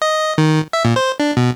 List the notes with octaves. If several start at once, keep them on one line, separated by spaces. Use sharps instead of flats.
D#5
D#3
E5
A#2
C5
D4
B2